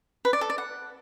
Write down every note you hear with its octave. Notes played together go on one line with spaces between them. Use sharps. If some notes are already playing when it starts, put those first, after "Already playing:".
B4
D5
A4
D5
F#5